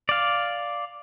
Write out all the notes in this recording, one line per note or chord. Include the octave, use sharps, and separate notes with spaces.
D5 F5